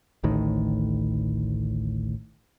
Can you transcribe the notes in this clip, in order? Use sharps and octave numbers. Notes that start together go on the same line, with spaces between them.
A1 D2 A2 D#3